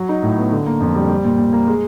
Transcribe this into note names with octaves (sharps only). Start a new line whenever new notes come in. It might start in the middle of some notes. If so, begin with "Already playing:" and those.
Already playing: F#3
D#4
A2
B3
D3
A#3
F2
G3
G3
A#2
A#2
A#3
G#3